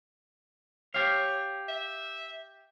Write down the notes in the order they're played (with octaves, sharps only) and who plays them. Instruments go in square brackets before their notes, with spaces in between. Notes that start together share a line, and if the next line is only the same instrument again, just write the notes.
[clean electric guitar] G4 F5 [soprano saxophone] C#5
[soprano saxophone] E5